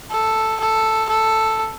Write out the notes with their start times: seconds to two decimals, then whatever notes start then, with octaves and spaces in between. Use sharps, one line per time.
0.11 A4
0.60 A4
1.09 A4